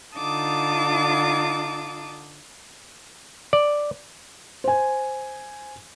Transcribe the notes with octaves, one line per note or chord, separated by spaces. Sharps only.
D3 D#4 F4 A5 D6 D#6
D5
C5 G#5